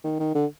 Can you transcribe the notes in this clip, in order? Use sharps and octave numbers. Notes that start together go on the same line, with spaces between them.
D#3
D#3
D3